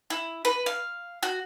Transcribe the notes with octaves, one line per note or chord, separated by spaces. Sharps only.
E4
B4
F5
F#4